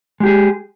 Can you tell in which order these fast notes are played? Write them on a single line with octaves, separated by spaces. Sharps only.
G#3 G4 G#4